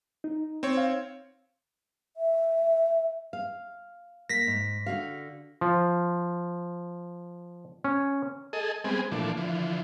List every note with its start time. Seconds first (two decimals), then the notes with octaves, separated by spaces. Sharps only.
0.24 D#4
0.63 C4 C#5
0.77 F5
2.17 E5
3.33 F5
4.30 A#3 A#6 B6
4.47 G#2
4.86 D3 F#4 F5
5.61 F3
7.84 C#4
8.53 G#4 A4 D#5
8.84 G3 G#3 B3 C4 G#4
9.12 A#2 E3 F3 A3 D4
9.37 D3 E3 F3